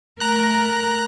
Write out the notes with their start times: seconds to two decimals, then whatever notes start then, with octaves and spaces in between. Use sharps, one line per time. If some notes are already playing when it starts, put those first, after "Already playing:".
0.20 A3 A#4 A#5 F#6